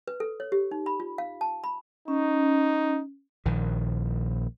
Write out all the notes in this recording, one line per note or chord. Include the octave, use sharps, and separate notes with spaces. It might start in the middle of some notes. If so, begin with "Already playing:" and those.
B4
A4
C#5
G4
D#4
B5
F4
F5
A5
B5
C#4 D#4
A#1 D#3